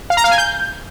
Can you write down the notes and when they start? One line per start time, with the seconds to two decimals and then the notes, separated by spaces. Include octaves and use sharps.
0.10 F5
0.17 A#5
0.24 F5
0.31 G#5
0.38 G6